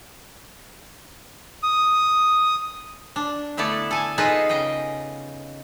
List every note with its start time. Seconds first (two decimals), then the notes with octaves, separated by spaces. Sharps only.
1.63 D#6
3.16 D4
3.57 D3 A3 B3 E4 D5 A5
3.91 A4 G#5 A5
4.18 D#4 F4 G#4 A4 B4 D#5
4.49 C#3 D#5 G5